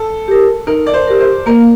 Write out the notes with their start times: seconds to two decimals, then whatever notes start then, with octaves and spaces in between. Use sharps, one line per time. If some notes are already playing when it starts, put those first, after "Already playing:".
Already playing: A4
0.28 G4 A#4
0.67 D#4 A#4
0.87 D5
0.94 C5
1.07 G4 A#4
1.20 C5
1.46 A#3 A#4